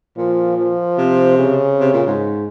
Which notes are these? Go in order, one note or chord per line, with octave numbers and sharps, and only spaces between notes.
A#2 F3
F3
C3
C#3
C3
A#2
G#2